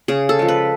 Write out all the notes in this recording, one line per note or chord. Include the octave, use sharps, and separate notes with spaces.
C#3 G#4
A4
F3 G#3
B4